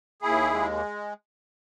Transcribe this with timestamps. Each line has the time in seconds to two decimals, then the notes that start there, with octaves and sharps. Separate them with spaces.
0.22 D#2 E4 G#4
0.54 G#3